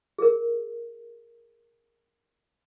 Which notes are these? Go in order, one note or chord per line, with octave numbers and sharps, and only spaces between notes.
G#4 A#4